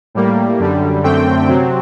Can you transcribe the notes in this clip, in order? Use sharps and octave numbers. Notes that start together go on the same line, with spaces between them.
A2 G3 A#3
F#2 D3 G3
F#2 D3 A3 C4 G5
C3 F#3 C4